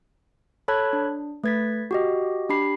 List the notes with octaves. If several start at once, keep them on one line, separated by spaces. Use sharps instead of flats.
A4 C#5 A5 B5 F#6 G#6
D4
A3 B4 G#6 A6 B6
F#4 G4 D#5
D4 G4 B5 C7